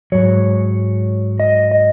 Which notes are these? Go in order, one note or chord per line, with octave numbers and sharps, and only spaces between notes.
G#2 F#3 C#5
D#5
D#5